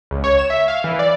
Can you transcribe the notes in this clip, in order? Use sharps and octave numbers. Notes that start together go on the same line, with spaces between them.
C#2
C#5
E7
E5
F5
E3
D5